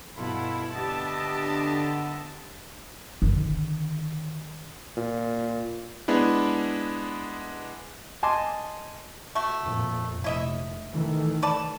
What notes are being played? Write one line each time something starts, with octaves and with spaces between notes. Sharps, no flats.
G2 B2 E4 F4 A4 B5
D3 B3 G4 D#5 E5 A5
D3 D#3
A#2
G#3 B3 D4 E4
D#5 G#5 A5 C6 D6
A3 F#4
F2 A#2
F1 E4 D#5 E5
D#3 E3 A3
B4 D5 A5